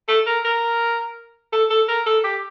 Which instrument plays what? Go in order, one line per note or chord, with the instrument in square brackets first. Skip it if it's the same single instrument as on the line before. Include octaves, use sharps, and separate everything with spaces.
[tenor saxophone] A4
A#4
A#4
A4
A4
A#4
A4
G4